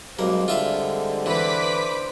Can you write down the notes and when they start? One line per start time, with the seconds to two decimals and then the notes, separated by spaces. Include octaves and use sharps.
0.19 B1 G3 G#3 A#3 C4
0.48 D3 F4 E5 B5
1.26 E3 B4 C5 D6 B6